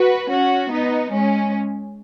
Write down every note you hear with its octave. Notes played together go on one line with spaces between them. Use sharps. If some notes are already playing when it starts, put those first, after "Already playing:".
Already playing: F#4 B4
C#4 F#4
B3 D#4
G#3 C#4